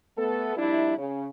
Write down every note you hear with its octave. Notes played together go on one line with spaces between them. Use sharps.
A3 B3 A4
F2 G3 D4 E4
C#3